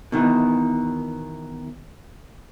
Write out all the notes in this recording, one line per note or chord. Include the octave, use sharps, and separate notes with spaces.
B2 D#3 E3